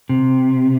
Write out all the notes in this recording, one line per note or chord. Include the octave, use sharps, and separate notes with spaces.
C3